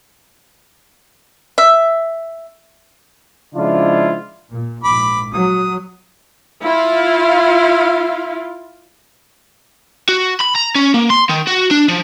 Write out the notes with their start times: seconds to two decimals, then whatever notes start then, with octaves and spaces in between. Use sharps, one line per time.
1.58 E5
3.54 C#3 F3 G#3 D4 E4 F4
4.51 A#2
4.84 A#1 G#2 B5 D6
5.33 F#3 D#6
6.63 E4 F4 F5
10.09 F#4
10.40 B5
10.55 A#5
10.75 C#4
10.94 A#3
11.10 C6
11.29 D#3
11.47 F#4
11.71 D4
11.88 F3